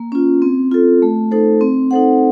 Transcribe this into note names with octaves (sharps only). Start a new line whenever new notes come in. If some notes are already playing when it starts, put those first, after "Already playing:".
Already playing: A#3
C#4 F4
C4
F4 A4
A3
D#4 A4 C5
C4
D#4 A4 C5 F#5